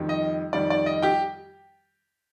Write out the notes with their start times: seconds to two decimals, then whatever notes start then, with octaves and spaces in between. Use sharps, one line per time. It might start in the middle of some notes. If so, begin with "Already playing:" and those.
Already playing: F2 D#3 G3
0.09 D#5
0.53 F2 D#3 G3 D5
0.70 D5
0.86 D#5
1.02 G4 G5